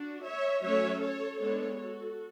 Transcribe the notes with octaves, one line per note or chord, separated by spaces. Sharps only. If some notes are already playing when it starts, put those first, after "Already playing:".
Already playing: D4 F#4
C#5 E5
F#3 A3 C#4 C#5 E5
A4 C#5
G#3 B3 D4 A4 C#5
F#4 A4